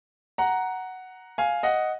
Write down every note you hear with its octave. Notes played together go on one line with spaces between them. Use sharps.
F#5 A#5
F5 G#5
D#5 F#5